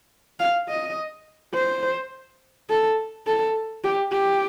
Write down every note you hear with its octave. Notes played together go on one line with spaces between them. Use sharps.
F5
D#5
C5
A4
A4
G4
G4